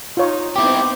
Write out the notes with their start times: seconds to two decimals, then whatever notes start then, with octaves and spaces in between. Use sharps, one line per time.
0.17 D#4 F4 C#5
0.56 B3 C4 D#4 E4 G4 D6